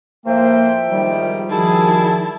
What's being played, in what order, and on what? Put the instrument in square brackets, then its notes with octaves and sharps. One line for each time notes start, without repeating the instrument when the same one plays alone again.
[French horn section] A2 C5 [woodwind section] F3 E5 G5 [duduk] A#3
[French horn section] E2 G#2 D#3 [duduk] G3
[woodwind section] D#3 F3 [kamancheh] E4 A5 [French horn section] F#4 G#4